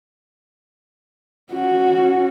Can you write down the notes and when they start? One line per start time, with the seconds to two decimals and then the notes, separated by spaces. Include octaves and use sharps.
1.52 C#4 F#4